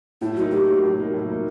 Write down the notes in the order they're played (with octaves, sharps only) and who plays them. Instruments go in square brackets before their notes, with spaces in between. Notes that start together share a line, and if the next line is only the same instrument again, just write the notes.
[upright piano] A2 [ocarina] E4
[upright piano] F#3 A#3 D#4 [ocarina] F#4
[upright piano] A2 [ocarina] G4
[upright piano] F#3 A#3 D#4
A2
F#3 A#3 D#4
A2
F#3 A#3 D#4